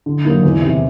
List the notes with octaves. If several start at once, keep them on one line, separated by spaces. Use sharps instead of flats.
D3
F#3 A#3 D#4
E2
C3 D#3